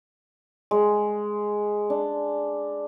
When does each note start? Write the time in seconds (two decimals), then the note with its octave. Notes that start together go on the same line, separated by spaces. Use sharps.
0.71 G#3
1.90 D4